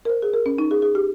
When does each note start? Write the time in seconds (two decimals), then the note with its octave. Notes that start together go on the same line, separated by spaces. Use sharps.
0.05 A#4
0.10 C5
0.22 G#4
0.34 A#4
0.46 C#4
0.58 D#4
0.71 G#4
0.82 G#4
0.95 G4